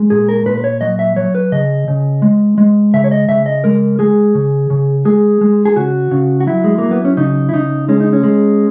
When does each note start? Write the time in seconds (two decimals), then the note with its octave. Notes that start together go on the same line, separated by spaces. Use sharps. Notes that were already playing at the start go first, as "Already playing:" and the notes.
Already playing: G#3
0.10 A#2 G#4
0.29 A#4
0.46 A#2 B4
0.58 B4
0.64 C#5
0.81 F#3 D#5
0.99 E5
1.16 F#3 C#5
1.35 B4
1.52 C#3 D#5
1.88 C#3
2.22 G#3
2.58 G#3
2.94 C#3 E5
3.04 C#5
3.11 D#5
3.29 C#3 E5
3.46 D#5
3.64 G#3 A#4
3.99 G#3 G#4
4.35 C#3
4.70 C#3
5.05 G#3 G#4
5.41 G#3
5.65 G#4
5.76 C#3 F#4
6.11 C#3
6.40 F#4
6.47 F#3 E4
6.64 G#3
6.78 F#3 A#3
6.91 B3
7.05 C#4
7.17 C#3 D#4
7.49 E4
7.53 C#3 D#4
7.89 G#3 C#4
8.00 D#4
8.13 C#4
8.23 G#3